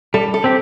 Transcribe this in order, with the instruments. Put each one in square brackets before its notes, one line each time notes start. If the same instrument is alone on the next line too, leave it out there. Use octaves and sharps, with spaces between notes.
[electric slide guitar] G3 [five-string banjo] A4
[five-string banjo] A4
[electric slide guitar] C4 G4